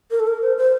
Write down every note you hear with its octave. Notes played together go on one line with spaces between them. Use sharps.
A#4
A4
A#4
C5
C5